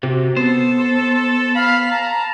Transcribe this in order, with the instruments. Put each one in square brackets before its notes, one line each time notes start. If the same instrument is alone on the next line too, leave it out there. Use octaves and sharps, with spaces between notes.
[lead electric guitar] C3 [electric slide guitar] F#4 G4
[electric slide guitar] B3 [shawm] A4 [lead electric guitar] C5
[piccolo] F5 [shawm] B5
[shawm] A5 [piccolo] A#5